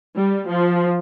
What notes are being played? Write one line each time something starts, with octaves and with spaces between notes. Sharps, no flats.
G3
F3